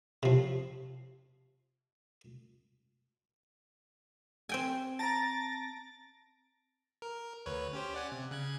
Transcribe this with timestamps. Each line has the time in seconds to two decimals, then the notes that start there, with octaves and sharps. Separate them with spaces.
0.23 C3 F3
4.49 C4 G5 G#5
4.99 A5 A#5 A6 A#6 D7
7.02 A#4
7.46 D2 B4 C#5
7.73 C#4 G4 C5
7.94 D5 F#5 G#5
8.12 C3
8.31 C#3 F#6 G#6